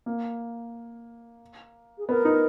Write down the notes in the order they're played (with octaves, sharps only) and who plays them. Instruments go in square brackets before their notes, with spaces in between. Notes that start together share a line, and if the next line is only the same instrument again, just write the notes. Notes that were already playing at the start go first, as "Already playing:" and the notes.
[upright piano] A#3
[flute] G#4
[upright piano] B3 [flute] A#4
[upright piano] D#4